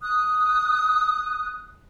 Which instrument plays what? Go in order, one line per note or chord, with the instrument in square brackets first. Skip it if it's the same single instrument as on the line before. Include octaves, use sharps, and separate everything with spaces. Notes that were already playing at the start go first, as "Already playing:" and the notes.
[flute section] D#6 F#6